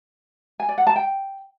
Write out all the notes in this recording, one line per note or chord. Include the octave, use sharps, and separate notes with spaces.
G#5
D5
F#5
A5
G5